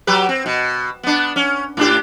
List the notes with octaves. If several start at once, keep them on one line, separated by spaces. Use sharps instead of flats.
F#3 G4 B4
C4
B2
B3 D4
C#4
A2 D4 G4